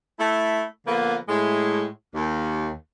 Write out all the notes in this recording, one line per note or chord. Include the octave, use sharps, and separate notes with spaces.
A3 E4
D3 F3 A#3 B3
A2 G#3
D#2